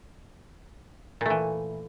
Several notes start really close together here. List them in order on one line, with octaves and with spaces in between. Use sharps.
A#2 A3 E3